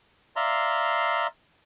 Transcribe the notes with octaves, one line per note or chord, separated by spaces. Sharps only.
D5 E5 F5 A#5 C6